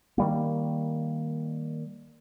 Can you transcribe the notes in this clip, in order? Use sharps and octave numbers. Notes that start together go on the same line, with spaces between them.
D#3 G3 A#3